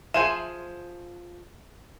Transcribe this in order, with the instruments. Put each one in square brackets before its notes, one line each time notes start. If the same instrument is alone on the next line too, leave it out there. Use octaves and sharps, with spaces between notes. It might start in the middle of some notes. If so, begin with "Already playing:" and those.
[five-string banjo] F3 G#4 C5 [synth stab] E5 C6 [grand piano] D#7 E7